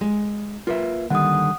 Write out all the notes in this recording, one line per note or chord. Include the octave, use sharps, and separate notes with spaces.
G#3
A#3 F4 B4 E5
D3 D#3 G3 F#5 D#6